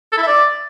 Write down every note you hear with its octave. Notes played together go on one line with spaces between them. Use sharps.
A4
E4
E5
D5